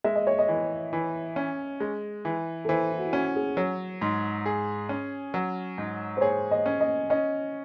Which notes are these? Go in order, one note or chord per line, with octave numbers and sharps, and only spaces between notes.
G#3 E5
D#5
C#5
D#5
E3
E3
C#4
G#3
E3
A4
E3 C5
E4
F#4
E4
C#4 F#4
G#4
F#3 C#5
G#2
G#4
C#4
F#3
G#2
C5
G#4 C#5
D#5
C#4
D#5
C#4 D#5